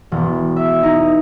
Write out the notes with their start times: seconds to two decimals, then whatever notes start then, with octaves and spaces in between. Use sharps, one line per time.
0.12 E1
0.56 E5
0.83 D#4